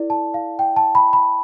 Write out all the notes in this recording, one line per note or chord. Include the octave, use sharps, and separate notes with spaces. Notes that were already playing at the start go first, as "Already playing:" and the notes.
Already playing: E4 A4 D5
A5
F5
G5
A5
B5
B5